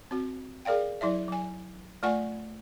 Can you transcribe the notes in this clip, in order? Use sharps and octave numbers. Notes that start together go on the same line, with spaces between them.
C4 F#4
G#4 A#4 D5 F5 G5
F#3 E4 D5 E5
F#3 G#5
A3 F4 D5 F#5 G#5 C#6